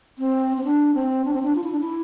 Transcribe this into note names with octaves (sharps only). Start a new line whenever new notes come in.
C4
C4
D4
C4
D4
C4
D4
F4
E4
D4
E4